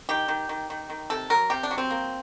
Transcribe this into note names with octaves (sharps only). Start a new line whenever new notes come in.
D#3 G4
D#3
D#3
D#3
D#3
C3 A4
F#3 A#4
C3 G4
D4
F#3
C4
A#3